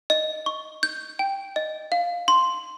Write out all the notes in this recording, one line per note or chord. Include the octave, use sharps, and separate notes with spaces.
D#5
C#6
G6
G5
D#5
F5
C6